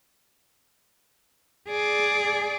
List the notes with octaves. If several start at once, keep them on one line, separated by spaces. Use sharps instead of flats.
G#4 D5